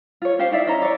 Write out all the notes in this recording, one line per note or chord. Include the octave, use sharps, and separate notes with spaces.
F4 C#5
C#4 G4 C5 F5
D#4 E4 D5 E5
C#4 E4 D#5 A#5
C#5 D5